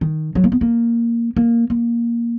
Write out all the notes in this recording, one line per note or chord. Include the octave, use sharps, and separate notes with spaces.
D#3
F#3
A#3
B3
A#3
A#3
A#3